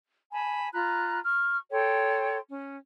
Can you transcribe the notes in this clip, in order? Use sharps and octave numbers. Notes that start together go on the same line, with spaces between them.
G#5 A5 B5
F4 A#5 B5 F#6
C#6 F6
A4 C#5 G5 C6
C#4